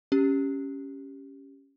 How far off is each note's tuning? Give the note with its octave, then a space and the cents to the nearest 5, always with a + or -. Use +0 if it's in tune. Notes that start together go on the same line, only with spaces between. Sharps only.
C#4 +0 G4 +0